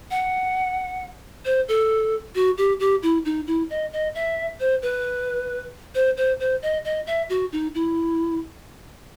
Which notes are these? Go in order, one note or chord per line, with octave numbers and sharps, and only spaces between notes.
F#5
C5
A4
F#4
G4
G4
E4
D#4
E4
D#5
D#5
E5
C5
B4
C5
C5
C5
D#5
D#5
E5
F#4
D#4
E4